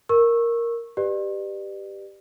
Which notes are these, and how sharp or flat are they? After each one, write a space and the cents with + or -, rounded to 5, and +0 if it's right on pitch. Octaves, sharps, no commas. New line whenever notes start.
A#4 +0 C#6 -20 E6 +0
G4 +0 B4 +0 D5 +35